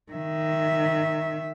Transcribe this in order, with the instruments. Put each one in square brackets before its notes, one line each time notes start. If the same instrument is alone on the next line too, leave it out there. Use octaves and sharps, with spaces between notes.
[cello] D#3 E5